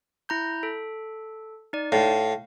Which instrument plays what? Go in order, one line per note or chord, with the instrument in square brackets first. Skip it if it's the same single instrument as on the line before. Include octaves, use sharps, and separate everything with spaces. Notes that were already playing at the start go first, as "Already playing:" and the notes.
[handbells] E4 A#5 G6
A4
D#4 D5
[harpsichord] A2 [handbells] F5